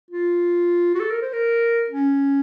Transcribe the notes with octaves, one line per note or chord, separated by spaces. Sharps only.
F4
F#4
A4
A#4
C5
A#4
C#4